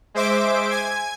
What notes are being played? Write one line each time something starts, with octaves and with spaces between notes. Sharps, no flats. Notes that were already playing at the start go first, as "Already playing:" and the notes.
G#3 C5 E5 D6 D7
G#5 G#6